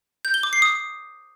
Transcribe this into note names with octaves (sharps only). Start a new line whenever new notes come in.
G6
G7
D6
C7
D#6